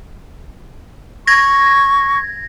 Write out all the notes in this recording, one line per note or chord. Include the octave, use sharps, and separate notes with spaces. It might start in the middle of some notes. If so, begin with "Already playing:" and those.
C#6 G#6 A#6